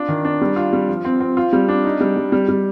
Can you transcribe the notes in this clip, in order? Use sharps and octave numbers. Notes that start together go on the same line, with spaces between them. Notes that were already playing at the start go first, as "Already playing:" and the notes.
Already playing: D4 F4
D#3
D4
G3
F4
G3
F3
C4
C4
F4
G3
D4
D#4
G3
G3
G3
G3